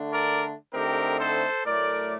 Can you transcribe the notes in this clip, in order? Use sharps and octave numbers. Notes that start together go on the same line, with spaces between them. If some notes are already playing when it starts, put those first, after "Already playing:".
Already playing: D3 A3 D4
A#4 D5
D3 A3 C4 D#4 G4 A#4
A4 C5
A2 F#3 A3 A#4 D5